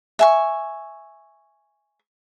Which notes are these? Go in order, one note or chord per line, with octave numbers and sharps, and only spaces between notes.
E5 G#5 C#6